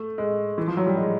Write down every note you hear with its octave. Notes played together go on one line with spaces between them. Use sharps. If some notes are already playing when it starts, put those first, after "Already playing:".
Already playing: A3
G#3
E3
F3
F#3
G3
G#3